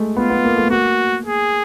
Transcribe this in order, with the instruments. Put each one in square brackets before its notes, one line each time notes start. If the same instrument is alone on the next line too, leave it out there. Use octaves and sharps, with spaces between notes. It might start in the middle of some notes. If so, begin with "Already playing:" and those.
Already playing: [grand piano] G#3 A3
[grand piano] B3 [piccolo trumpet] F4
[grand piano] B3
A#3
A3
[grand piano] A#3 [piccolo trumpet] F#4
[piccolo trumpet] G#4